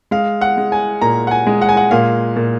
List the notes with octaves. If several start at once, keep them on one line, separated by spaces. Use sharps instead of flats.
G#3 F5
F#5
G#3
G#5
A#2 A#5
F#5
G#5
G#3
F#5
G#5
F#5
A#2 F5
A#2